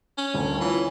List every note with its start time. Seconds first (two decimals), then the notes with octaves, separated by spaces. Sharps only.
0.18 C#4
0.34 D#1 D2
0.61 E3 F4 C#5